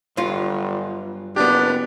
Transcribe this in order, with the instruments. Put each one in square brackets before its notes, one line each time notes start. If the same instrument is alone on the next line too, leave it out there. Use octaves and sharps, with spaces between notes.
[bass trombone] G1 [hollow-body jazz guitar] G2 F#3 F4
[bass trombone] F#1 [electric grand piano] B3 G4 [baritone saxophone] D4